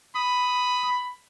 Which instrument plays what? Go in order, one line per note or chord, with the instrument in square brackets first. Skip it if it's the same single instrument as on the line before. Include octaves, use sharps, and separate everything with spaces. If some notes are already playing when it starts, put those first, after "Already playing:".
[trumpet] B5 [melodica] D#6